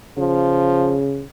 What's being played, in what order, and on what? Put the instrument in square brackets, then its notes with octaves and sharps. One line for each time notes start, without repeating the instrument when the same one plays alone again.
[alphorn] C#3 [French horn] F3